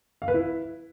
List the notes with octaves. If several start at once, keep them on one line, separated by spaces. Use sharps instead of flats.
F5
B4
E4